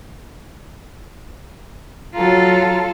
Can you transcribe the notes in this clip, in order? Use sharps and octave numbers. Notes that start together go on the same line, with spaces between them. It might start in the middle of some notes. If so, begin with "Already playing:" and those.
F#3 F4 A4 A#5